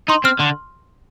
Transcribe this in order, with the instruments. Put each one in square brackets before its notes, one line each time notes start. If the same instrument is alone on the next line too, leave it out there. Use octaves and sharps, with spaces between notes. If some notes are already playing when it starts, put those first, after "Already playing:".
[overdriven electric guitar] D#4 [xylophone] C6
[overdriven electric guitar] C4 [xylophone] F6
[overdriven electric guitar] D3 [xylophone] C6